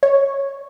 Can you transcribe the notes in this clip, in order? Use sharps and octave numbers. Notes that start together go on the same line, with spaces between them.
C#5